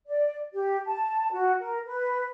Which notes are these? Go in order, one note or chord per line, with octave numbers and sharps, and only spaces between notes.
D5
G4
A5
F#4
A#4
B4